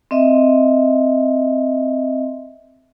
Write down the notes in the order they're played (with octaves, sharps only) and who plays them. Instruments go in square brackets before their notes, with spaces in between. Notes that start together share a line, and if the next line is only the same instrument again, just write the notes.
[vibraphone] C4 D#5 E5